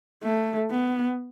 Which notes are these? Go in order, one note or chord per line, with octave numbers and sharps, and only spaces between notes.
A3
B3